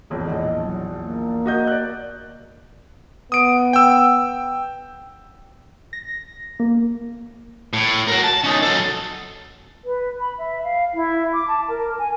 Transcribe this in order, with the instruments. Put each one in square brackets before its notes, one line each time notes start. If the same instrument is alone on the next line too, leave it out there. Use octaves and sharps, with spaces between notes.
[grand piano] E1 A1 F2
[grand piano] A#1 E2 [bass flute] D#5
[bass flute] F#3
A#3
[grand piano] F#4 D#5 G6
D5 F#6
[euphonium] B3 [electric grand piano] D#6 D7
[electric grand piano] G5 E6
[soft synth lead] A#6
A#3
[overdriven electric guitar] A2
F#4 A#4
A5
C#4 D#4
F#3 A4
[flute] B4
B5
E5
F5
E4
D6
A5
A#4
G#5